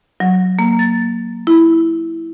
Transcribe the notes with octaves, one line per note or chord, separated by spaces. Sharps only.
F#3
A#3
A6
E4